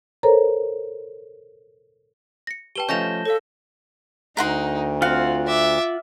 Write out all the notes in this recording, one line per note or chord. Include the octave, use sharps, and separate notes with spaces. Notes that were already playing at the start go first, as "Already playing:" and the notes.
A4 A#4 C5 C#5 A#5
A#6 C#7
G4 B4 G5 A5 E7 G7
F3 A3 C#4 D#5 G6 A#6 E7 F7
A4 C#5 F5
D2 D#4 A#4 F#5 C6
C4 F4 F5 F#5
E5 D6